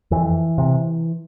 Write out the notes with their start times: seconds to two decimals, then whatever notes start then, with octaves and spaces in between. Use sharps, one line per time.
0.11 F2 E3
0.58 C3